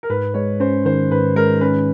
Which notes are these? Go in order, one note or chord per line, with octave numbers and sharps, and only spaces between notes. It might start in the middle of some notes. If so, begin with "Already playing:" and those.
A#4
G#2 B4
G#3 C#5
C#4 C5
D#3 C5
G#2 B4
G#3 A#4
C#4 B4